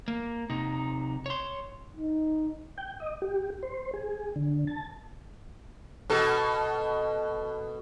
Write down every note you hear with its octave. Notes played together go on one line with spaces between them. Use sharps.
A#3
C3 D#4
C#5 C6
D#4
G5
D#5
G4
C5
G#4
D3
A5
B2 A4